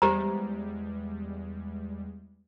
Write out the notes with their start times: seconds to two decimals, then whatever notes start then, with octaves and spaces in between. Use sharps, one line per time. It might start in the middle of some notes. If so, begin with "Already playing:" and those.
0.02 E2 G3 G#3 G4 C5 A#5